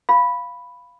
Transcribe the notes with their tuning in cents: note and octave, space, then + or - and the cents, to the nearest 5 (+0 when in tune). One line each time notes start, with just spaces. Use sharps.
F5 +0 B5 +0